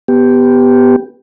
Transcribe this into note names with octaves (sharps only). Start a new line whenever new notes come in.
B3 G4